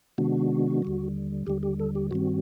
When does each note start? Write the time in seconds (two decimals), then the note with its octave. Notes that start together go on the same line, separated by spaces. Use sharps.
0.18 C3 D#3 G#3 B3 D4 F#4
0.82 D#2 D3 G3
1.47 D#2 D3 G3 G4
1.63 G4
1.80 A4
1.95 G4
2.11 G2 D#3 G3 C4 F#4